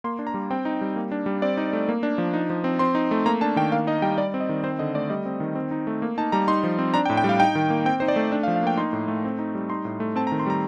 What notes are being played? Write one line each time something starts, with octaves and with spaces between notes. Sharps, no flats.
A#3 C6
D4
A#5
G3
C4 G5
D#4
G3
A#3
D4
G3
C4 D5
D#4
A3
A#3
D4
F3
D#4
F3
C4
C4 C6
D#4
A3
A#3 A#5
D4 A5
D#3 G5
A#3 F5
D#4 D#5
G3 G5
G3 D5
C4
D#5
D#3
C4 C5
D3 D#5
A3 D5
G3 D#5
C4
D#3
C4
D#4
A3
A#3
D#4 A5
G3 A#5
D#4 C6
F3
C4
D4 A#5
G5
A2
G5
G3
F5
D#4 G5
D#3
A#3
C4 G5
D#4 C5
D5
A3
D4
F5
F3
F5
A#3 G5
D#4 C6
A2
A3
C4
D#4
G3
D#4 C6
A2
A3
C4 A5
A#5
D#3
C6
G3 A#5